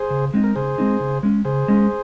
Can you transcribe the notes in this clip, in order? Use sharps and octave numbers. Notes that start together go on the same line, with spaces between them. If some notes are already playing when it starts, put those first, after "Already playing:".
Already playing: G#4 C5
C#3
G#3 C4 D#4
A#4
C#3 G#4 C5
G#3 C4 D#4
C#3
G#3 C#4
C#3 G#4 C5
G#3 C#4